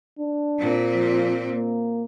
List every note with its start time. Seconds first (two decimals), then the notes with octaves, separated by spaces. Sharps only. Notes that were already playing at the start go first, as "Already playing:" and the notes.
0.19 D4
0.59 A#2 C4
0.94 F3
1.52 A#3